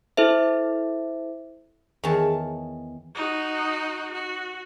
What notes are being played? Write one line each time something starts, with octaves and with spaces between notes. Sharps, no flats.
E4 A4 C5 E5
E2 D#3 C#5 A5
D#4 F#4
F#4